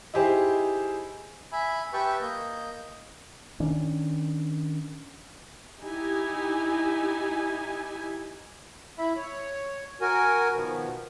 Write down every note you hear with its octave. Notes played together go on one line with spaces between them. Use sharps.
D#4 E4 G4 G#4 C5
E5 G#5 B5
G4 B4 E5 G5 A5 C#6
A#3 D#5 G6
D#3 C#4 D4
D#4 E4 G4 G#5
E4 E5 B5
C#5
F#4 A#4 G#5
B2 D#3 F3 B3